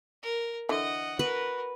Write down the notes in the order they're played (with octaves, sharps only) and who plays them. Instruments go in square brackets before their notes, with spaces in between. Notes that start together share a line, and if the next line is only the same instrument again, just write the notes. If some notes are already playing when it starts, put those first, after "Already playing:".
[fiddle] A#4
[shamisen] D3 E3 [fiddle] D#5 F#5
[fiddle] F#4 A#4 [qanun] B4